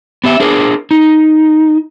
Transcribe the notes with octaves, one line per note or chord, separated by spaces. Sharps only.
B3 G4 E5
D4 G#4 A#4 C5
D#4